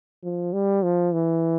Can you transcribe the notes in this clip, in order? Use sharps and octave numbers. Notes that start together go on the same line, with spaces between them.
F3
G3
F3
E3